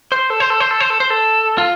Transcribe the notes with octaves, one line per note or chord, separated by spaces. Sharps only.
C5
A4
C5
A4
C5
A4
C5
A4
C5
A4
F4